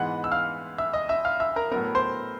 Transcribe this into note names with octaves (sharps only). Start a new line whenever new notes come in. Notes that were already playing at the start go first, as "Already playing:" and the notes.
Already playing: G#2 E3 G#3 B3 F#5 F#6
E6
F5 F6
E5 E6
D#5 D#6
E5 E6
F5 F6
E5 E6
A#4 A#5
A2 F#3 B3 A#4 A#5
C5 C6